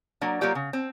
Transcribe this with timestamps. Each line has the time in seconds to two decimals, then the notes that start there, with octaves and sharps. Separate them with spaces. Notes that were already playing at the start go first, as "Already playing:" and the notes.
0.21 F#3 A#3 D4
0.41 F#3 A#3 F4 G4 D5
0.55 C#3
0.73 C4